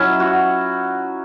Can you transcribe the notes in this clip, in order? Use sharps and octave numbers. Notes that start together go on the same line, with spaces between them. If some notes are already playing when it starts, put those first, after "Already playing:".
Already playing: F#3 C#4 E4 E5
F#4